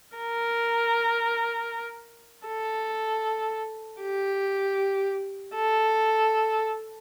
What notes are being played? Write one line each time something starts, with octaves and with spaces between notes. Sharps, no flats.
A#4
A4
G4
A4